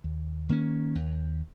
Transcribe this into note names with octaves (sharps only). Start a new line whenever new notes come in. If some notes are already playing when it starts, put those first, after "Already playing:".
D#2
D#3 A#3 C#4
D#2